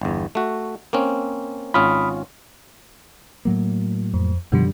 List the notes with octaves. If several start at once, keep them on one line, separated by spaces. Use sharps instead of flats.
G1 E2
A3 F#4
A#3 C4 C#4
G#1 C#4 F4 B5 D#6 F6
A2 F#3 A#3
F2
F#2 B2 D3 F3 G3